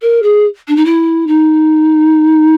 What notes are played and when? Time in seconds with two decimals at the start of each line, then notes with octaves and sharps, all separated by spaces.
0.02 A#4
0.23 G#4
0.68 D4
0.76 D#4
0.85 E4
1.27 D#4